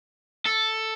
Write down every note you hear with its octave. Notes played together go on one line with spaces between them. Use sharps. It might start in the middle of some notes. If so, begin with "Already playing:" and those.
A4